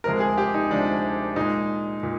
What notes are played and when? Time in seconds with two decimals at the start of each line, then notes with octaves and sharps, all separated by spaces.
0.04 D2 C3 F3 G#3 A#4
0.20 G#4
0.38 G4
0.54 D#4
0.70 D2 C3 F3 G#3 D4
1.36 A#2 G#3 D#4
2.03 A#2